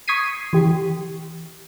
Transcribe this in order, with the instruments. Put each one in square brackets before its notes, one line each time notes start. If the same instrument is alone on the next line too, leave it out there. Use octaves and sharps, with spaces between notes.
[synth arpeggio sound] C#6 D#6 G#6 B6 C7 D#7
E3 G4